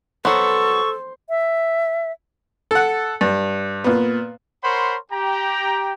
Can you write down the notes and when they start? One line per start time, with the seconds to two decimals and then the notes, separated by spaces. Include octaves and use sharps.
0.25 F#3 B3 A4 C5 C#6
1.29 E5
2.71 A4 F#5
3.21 G2
3.84 A#2 B3
4.64 A#4 C5 C#5 F#5 B5 C6
5.12 G4 G5 A#5